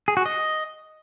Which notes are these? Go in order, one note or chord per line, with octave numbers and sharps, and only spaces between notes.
G#4
F#4
D#5